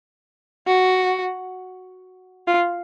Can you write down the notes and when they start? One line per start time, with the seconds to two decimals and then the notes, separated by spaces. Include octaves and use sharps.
0.67 F#4
2.47 F4